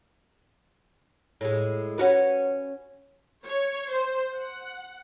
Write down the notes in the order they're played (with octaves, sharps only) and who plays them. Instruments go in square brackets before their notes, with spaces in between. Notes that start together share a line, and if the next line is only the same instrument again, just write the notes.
[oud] A2 G#3
C#4 F#4 B4
[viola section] C#5
C5
F#5